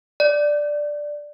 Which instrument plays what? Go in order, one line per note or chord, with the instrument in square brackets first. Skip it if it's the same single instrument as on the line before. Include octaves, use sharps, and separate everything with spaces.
[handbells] D5